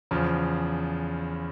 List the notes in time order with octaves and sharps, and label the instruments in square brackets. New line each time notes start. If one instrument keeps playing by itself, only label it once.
[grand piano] E2 C#3 F3